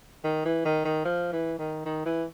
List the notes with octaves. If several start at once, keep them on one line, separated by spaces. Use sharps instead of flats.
D#3
E3
D#3
D#3
F3
E3
D#3
D#3
E3